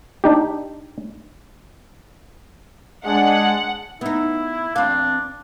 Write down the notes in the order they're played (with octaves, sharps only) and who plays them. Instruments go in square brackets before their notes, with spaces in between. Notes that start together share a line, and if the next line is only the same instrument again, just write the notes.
[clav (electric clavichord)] D4 D#4 G4
[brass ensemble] G#3 D4 G#4 [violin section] F#5
[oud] B3 D#4 [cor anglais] E4
[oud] E2 C4 F5 [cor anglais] D4